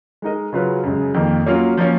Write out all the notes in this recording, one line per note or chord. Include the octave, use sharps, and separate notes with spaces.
G#3 D#4 A#4 D#5
C#3 F#3 C#4 F4 B4
F#2 C#3 G#3
F2 D#3 A#3
F#3 A#3 C#4 F4
F3 A#3 C#4